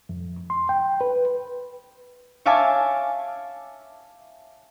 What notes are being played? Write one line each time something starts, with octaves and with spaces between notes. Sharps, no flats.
F2
C6
G5
B4
C#5 E5 F5 G#5 A5 D6